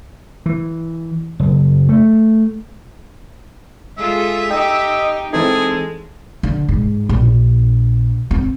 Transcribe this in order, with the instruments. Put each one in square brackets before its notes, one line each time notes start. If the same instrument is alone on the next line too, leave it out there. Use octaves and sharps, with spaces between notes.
[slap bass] E3
F#1
A3
[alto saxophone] G#3 [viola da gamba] F4 G#4 A4 [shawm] E5
[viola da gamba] D#4 G4 [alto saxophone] D#5 [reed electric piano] G5
[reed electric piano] E3 C4 D#4 [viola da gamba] G#3 [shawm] G#4 [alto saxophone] A4
[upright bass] D3
G#2
A#1
C4